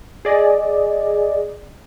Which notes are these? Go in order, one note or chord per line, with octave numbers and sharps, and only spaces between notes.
G#4 D5 D#5